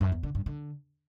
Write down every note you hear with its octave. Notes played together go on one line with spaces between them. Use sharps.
F#2
E2
D3
G2
D3